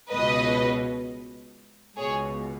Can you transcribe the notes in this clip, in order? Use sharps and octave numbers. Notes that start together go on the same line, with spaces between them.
C#2 B2 B4 D#5
C#2 B2 G#4 C#5